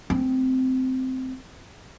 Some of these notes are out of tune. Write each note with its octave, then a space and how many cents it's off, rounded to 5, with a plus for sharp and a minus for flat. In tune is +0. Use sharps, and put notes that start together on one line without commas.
A3 -15 C4 -15